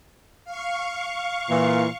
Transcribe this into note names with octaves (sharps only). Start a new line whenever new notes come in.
F5 C#6
A#2 E3